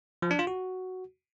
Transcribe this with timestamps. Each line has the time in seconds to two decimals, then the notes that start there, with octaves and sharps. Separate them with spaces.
0.22 F3
0.31 D4
0.39 F4
0.47 F#4